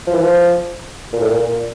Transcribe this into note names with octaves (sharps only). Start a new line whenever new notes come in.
F3
E3
F3
A#2
A2
A#2
A#2